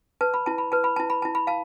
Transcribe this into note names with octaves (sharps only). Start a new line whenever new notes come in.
B4 A5
B5
E4 A5
B5
B4 A5
B5
E4 A5
B5
E4 A5
B5
F5 A5